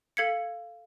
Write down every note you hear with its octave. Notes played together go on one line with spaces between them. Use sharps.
A4 F5 G#6 B6 C#7